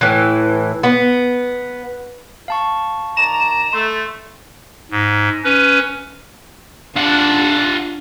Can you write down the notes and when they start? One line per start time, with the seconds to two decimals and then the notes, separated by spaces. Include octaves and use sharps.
0.01 A2 E3
0.83 B3
2.48 F5 A5 C#6
3.17 D#3 D5 A#5 E7
3.73 A3 C6
4.91 G#2
5.44 C#4 B4
6.96 D4 F4 F#5